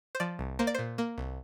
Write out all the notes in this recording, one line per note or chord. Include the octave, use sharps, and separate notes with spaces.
C5
F3 D5
C2
A#3 C5
D5
A#2 C5
A#3
C2